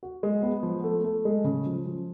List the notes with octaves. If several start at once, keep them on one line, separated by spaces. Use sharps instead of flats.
F#4
G#3
B3
F3
A3
A3
G#3
C#3
F3
F3